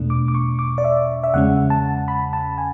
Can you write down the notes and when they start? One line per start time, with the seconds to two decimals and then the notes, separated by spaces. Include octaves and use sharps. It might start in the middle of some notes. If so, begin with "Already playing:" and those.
Already playing: E2 B2 A3 D4
0.10 D6
0.28 D6
0.35 C#6
0.59 D6
0.78 D5
0.84 E5
1.23 E5
1.34 E2 C#3 G#3 C#4 F#5
1.70 A5
2.08 B5
2.33 A5
2.58 G#5